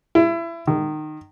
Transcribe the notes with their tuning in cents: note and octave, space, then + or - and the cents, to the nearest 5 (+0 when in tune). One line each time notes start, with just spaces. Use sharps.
E4 +25
D#3 -20